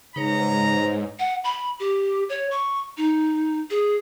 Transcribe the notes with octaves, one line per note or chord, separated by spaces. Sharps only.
G#2 C#3 D#4 B4 C#5 A#5
F#5
B5
G4
C#5
C#6
D#4
G#4